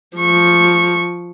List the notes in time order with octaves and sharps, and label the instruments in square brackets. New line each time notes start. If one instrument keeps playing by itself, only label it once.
[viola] F3 C#6